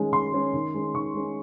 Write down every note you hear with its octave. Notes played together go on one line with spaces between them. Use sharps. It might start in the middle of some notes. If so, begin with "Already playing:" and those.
Already playing: D#3 G#3 C#4
D#3 C6
G#3 C#4
D#3
G#3 C#4
D#3 C#6
G#3 C#4